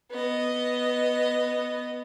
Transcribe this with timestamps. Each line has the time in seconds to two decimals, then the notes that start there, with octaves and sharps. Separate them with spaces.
0.11 B3 D#5